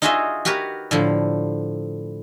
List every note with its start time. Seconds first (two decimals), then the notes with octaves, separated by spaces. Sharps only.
0.02 D#4 F4 F#4 G#4 D#5 E5
0.45 F#4 G4 A#4 B4 C#5
0.91 A2 D3 F3